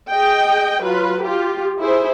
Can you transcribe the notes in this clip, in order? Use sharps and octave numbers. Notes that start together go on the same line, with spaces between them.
G#4 D#5 G5
F#3 F4 B4
F4 G4
E4 G#4 C5